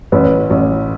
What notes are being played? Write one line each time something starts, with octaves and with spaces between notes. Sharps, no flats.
A1 B4
A1